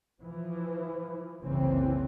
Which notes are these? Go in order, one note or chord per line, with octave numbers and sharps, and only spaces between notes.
E3 F3
F#1 C2 C#3 E3 C4